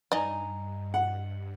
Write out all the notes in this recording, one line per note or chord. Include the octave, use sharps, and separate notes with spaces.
G2 D#4 D5 D#5 G#5 A#5
F#5